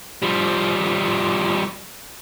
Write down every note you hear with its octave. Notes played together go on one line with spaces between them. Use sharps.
F3 G3